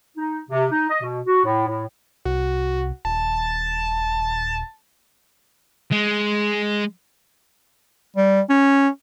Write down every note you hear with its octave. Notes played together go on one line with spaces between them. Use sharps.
D#4
C3
D#4
D#5
B2
F#4
A2
A2
C2 F#4
D#1 A5
G#3
G3
C#4